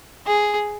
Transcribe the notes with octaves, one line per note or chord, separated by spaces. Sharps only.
G#4